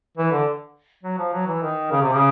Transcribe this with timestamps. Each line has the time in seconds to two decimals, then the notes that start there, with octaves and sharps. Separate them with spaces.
0.17 E3
0.31 D3
1.04 F#3
1.19 F3
1.34 F#3
1.47 E3
1.62 D#3
1.91 C#3
2.02 C3
2.12 C#3